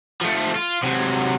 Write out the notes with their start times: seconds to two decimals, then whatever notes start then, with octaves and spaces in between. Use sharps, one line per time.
0.21 F3 A3
0.56 F4
0.83 C3 F#3